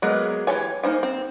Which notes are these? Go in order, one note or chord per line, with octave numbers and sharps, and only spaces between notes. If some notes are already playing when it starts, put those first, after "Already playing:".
F#3 G#3 A#3 B3
E3 F3 G4 C#5 G#5
A#3 D#4 C5 G#5
C4